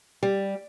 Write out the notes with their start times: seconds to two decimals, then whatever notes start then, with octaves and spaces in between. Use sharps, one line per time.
0.23 G3